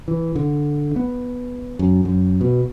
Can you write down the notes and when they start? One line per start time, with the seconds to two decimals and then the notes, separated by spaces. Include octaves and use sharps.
0.08 E3
0.36 D3
0.96 B3
1.79 F#2
2.05 F#2
2.41 B2